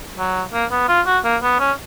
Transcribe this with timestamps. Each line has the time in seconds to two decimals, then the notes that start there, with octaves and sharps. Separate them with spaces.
0.17 F#3
0.53 A#3
0.71 B3
0.88 F4
1.06 F#4
1.24 A#3
1.43 B3
1.60 C#4